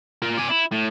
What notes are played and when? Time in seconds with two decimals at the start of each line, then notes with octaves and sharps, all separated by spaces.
0.22 F4 A#4
0.38 D5 G#5
0.50 E4
0.72 A2